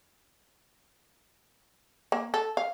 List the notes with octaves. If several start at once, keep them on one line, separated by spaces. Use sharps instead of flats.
A#3
A4
F5